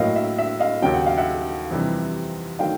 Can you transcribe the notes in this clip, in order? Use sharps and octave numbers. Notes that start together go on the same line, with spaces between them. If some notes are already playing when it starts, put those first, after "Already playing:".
Already playing: A2 F#3 A#3 D#5 F5
E5
E5
D#5 F5
D#2 C#3 F#3 G5
F#5
F5
E5 F#5
F2 C3 E3 G3
D#3 F#3 A3 F5 G5